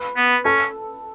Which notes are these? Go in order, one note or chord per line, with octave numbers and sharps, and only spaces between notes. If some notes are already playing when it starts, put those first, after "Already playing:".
Already playing: B4
B3
C#4 A4